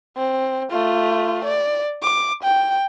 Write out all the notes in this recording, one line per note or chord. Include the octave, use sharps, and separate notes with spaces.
C4
A3 F4
D5
D6
G5